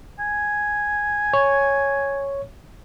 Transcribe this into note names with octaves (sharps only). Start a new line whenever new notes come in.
G#5
C#5